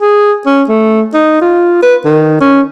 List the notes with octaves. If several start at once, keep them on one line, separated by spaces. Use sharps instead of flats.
G#4
C#4
A3
D#4
F4
B4
D#3
C#4